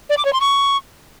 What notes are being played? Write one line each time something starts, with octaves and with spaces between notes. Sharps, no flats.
D5
D6
C#5
C6
C#6